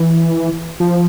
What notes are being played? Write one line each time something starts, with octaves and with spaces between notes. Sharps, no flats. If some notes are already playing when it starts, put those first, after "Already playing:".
Already playing: E3
F3